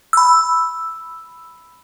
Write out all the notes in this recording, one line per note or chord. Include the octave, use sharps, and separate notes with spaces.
B5 E6